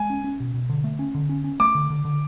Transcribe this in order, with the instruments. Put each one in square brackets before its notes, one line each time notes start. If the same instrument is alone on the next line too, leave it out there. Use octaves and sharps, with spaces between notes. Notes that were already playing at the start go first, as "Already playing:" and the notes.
Already playing: [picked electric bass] G#3 [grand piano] G#5
[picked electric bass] C#4
C#4
B2
B2
D3
A3
C#4
D3
C#4
C#4
[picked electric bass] A3 [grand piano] D6
[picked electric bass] D3
D3
D3